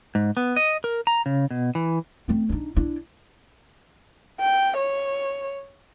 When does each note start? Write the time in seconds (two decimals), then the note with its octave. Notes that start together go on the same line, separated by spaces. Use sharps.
0.15 G#2
0.37 B3
0.56 D#5
0.84 A#4
1.07 A#5
1.26 C#3
1.51 B2
1.75 E3
2.28 A3 C4
2.49 D4 D#4
2.76 D4 E4
4.40 G5
4.77 C#5